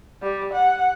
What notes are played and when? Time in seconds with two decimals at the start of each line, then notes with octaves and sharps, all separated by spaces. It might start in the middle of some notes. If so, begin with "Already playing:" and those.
0.22 G3
0.54 F#5